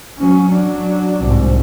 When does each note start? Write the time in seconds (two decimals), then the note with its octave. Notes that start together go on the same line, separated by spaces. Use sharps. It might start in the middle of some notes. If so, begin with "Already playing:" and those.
0.18 F#3 C#4
0.50 F#3 D4
1.22 C2 G#2